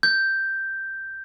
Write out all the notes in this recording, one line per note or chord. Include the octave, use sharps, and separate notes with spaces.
G6